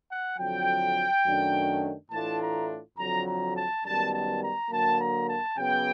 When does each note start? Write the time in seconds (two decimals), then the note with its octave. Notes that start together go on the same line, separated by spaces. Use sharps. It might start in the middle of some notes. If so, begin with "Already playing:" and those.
0.10 F#5
0.38 F2 D3 F#3 G5
1.25 F#2 D#3 F#3 A3 D4
2.11 A2 E3 A3 D4 F4 A5
2.40 A#5
2.97 F2 D3 F#3 A#5
3.26 A#5
3.55 A5
3.84 F#2 D#3 G3 B3 A5
4.14 A5
4.42 A#5
4.71 D3 F#3 A#3 A5
5.00 A#5
5.29 A5
5.58 C#3 F#3 B3 G5